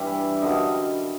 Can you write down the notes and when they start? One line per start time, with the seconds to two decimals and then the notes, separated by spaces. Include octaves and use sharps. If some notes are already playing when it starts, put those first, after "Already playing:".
Already playing: G2 E3 G3 E5
0.42 F#2 D3 G3 D#5